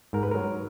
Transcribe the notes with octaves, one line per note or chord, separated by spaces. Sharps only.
G#2 A#4
B4
F#3 A#4